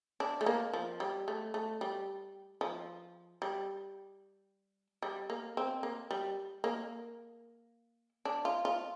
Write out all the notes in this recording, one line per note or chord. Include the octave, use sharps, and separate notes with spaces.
D4
A3
A#3
F3
G3
A3
A3
G3
F3
G3
G3
A#3
C4
A#3
G3
A#3
D4
F4
F4